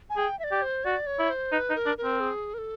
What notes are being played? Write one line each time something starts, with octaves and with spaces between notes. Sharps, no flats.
G#5
G#4 G5
E5
D5
G4
C5
F#4 D5
C#5
E4
C5
D#4 B4
D#4
A#4
D4
A#4
C4
G#4
A#4
A4